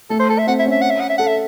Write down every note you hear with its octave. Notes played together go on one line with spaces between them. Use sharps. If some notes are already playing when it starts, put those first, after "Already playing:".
A3 A4
C5
A4
E5
C4 F#5
E5
C#4
E5
F#5
E5
F#5
E5
A4 F#5
E5